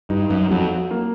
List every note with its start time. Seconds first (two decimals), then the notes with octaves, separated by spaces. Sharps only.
0.10 G2 D#4
0.30 F#2
0.50 F2 F#3
0.91 A#3